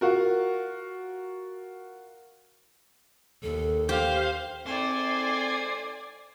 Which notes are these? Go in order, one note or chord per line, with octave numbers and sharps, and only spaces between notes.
F4 F#4 A#4
D#2 A4
G4 C5 F5
G#2 A3 C4 C5 D5 G#5